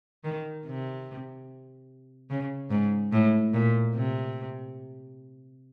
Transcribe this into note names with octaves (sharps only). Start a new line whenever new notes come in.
D#3
C3
C#3
G#2
A2
A#2
C3